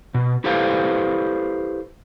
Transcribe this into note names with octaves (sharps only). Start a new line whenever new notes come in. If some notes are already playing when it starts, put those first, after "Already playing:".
B2
E4 G4 A4 B4 C5 F5